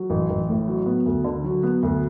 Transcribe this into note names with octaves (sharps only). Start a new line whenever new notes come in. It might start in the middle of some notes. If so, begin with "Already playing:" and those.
Already playing: F#3
A1
A1
A2
F#3
B3
D2
D3
F#3
B3
D2